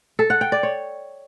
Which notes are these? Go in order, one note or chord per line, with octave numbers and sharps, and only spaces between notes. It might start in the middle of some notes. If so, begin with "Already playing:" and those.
A4
F#5
G5
D5
C#5